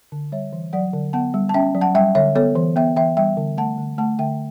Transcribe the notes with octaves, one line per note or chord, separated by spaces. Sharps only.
D3
G3 C#5 E5
E3
F#3 D5 F#5
D3
B3 F#5 A5
G3
A5
C#4 E5 G5
F#3
F#5 A5
G3 E5 G5
D3 C#5 E5
B3 A4 C#5
E3
B3 E5 G5
E3 E5 G5
G3 E5 G5
D3
A3 F#5 A5
D3
A3 F#5 A5
D3 E5 G5